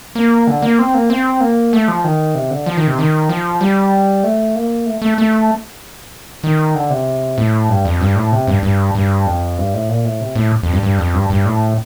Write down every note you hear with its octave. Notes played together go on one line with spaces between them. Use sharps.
A#3
D3
A#3
C4
A#3
C4
A#3
A3
F3
D#3
C3
D3
F3
D#3
C3
D#3
F3
G3
A3
A#3
A3
A3
A3
D#3
D3
C3
A2
G2
F2
G2
A2
C3
G2
G2
G2
F2
G2
A2
A#2
A2
C3
A2
F2
G2
G2
F2
G2
G2
A2